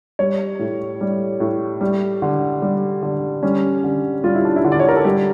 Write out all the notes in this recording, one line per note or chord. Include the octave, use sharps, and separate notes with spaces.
G3 C#5
A2
G3
A2
G3
D3
G3
D3
G3 C#4
D3
G3 F4
E4
D4
E4
D3
D5
C#5
A#4
A4
G3 G4